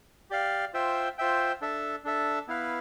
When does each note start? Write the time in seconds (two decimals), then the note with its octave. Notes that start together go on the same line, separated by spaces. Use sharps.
0.30 G4 D5 F5
0.74 F4 C5 E5 G5
1.18 F4 C5 E5 G5
1.61 D4 A4 E5
2.04 D4 A4 E5
2.48 B3 E4 B4 F5